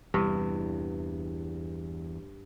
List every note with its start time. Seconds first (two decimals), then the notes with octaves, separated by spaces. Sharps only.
0.14 E2 G2 C3 E3